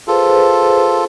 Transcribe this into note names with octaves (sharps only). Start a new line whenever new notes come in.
F4 G#4 A4 B4 C5